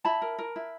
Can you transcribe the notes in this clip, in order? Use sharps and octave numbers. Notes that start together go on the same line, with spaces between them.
E4 A5 B5
A#4
A#4
E4